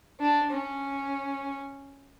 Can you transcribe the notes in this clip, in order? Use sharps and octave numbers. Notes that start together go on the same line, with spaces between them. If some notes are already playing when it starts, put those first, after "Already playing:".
D4
C#4